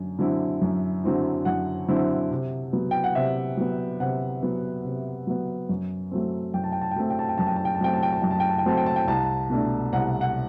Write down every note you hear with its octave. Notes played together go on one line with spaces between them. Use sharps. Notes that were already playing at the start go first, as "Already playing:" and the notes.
Already playing: F#2 D3
D3 F#3 C4 E4
F#2
D3 F#3 C4 E4
F#2 F#5
D3 F#3 C4 E4
C3
F#3 B3
G5
F#5
C3 E5
F#3 B3
C3 F#5
F#3 B3
C3
F#3 B3
F#2
F#3 A3 C4
F#2 G5
A5
G5
A5
G5
F#3 A3 C4 A5
G5
A5
G5
F#2 A5
G5
A5
G5
A5
F#3 A3 C4 G5
A5
G5
A5
F#2 G5
A5
G5
A5
G5
F#3 A3 C4 A5
G5
A5
G5
C2 A5
B2 A3 D4
C2 F#5
F#5